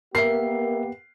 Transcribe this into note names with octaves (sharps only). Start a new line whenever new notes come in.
A#3 B3 G4 A#4 E5 C7